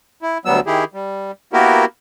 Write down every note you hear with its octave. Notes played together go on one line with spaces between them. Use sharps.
E4
D2 F#3 G3 B3 E6
D#3 E4 G4 G#4
G3
A#3 B3 E4 F#4 G4 A#4